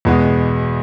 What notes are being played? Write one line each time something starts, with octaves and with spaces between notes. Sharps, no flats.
E2 B2 G#3 B3